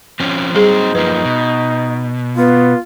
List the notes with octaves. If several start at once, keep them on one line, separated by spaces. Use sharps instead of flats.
F3 C4 C#4
F#3 G3 C4 D#4 G#4 C5
F#2 F3 A#3 B4
B2
B3 F4